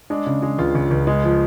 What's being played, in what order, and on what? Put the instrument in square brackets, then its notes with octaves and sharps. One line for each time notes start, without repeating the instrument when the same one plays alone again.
[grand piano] G#3 D4
C#3
G#3
C#2 F4
C#2
C#2
G#3
F3